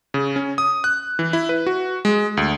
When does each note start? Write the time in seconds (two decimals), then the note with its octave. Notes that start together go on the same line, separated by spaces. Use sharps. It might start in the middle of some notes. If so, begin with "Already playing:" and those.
0.14 C#3
0.36 C#4
0.58 D#6
0.84 F#6
1.19 E3
1.33 E4
1.49 B4
1.67 F#4
2.05 G#3
2.37 D2